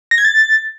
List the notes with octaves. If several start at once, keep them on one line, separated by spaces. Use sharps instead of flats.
A#6
G#6
A6